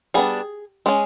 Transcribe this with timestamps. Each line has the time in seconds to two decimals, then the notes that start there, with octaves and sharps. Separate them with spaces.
0.14 G3 B3 D4 G#4
0.86 G#3 C#4 G#4